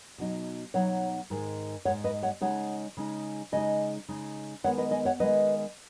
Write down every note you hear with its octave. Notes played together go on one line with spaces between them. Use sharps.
B2 F#3 D#4
B2 F#3 D#4 C#5 F#5
G#2 D#3 G#3
G#2 D#3 G#3 C#5 F#5
B4 D#5
C#5 F#5
C#3 G#3 D#4 C#5 F#5
C#3 G#3 D#4
C#3 G#3 D#4 D#5 G#5
C#3 G#3 D#4
D#3 G#3 B3 C#5 F#5
B4 D#5
D#5 G#5
C#5 F#5
D#3 G#3 B3 B4 D#5